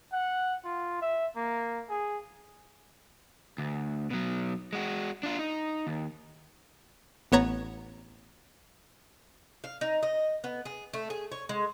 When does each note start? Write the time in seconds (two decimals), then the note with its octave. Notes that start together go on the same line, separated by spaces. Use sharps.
0.12 F#5
0.64 F4
1.01 E5
1.36 A#3
1.90 G#4
3.58 D2
4.10 B2 F#3
4.73 G#3 F#4
5.23 D4 F4
5.39 D#4
5.87 D#2
7.32 A1 B3 C#5 A#5
9.64 F5
9.81 D#4
10.03 D#5
10.44 B3
10.65 G#4
10.93 A3
11.10 G#4
11.32 C#5
11.49 G#3